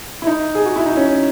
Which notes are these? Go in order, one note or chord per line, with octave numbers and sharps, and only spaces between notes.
E4
D#4
G#4
F#4
E4
D#4
C#4